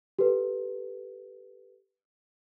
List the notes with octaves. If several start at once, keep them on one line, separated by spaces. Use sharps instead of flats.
G4 A4 B4